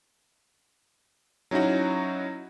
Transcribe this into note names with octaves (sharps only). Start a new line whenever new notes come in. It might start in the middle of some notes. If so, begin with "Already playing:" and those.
F#3 C#4 D#4 E4 F#4